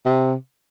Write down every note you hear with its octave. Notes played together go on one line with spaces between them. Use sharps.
C3